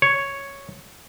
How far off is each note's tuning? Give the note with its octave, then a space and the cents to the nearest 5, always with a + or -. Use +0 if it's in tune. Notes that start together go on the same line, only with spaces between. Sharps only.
C#5 +0